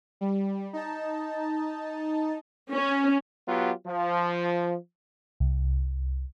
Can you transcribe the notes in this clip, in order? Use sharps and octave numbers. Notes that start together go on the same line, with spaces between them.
G3
D#4 A5
C#4
F#3 B3 F4 G4
F3
C2